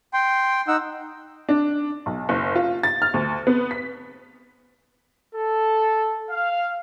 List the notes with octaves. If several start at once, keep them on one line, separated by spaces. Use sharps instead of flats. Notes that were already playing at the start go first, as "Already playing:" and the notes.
G5 C6
D#4 F#5 E6
D4
B1
F#1
F4
A6
F6
D2
B3
B6
A4
F5